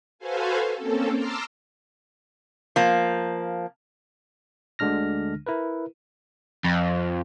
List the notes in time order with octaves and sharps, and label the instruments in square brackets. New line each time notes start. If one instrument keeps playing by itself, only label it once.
[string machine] F#4 A4 B4 C5 F5 G#5
A#3 C4 C#4 A4
A5 A#5 C6 D6 E6 F6
[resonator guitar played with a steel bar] F3 A#3
[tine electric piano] D2 D3 G#3 D4 F6 A#6
E4 A#4 B4
[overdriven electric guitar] F2